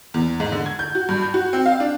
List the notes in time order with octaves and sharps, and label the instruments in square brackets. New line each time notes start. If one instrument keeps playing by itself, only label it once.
[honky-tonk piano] E2
G#2
D3
G#6
G6
F#4
G2
G6
F#4
C4
F5
D4